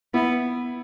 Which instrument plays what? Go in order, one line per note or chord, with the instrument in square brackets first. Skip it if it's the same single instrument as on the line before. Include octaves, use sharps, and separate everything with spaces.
[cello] B3 [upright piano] E4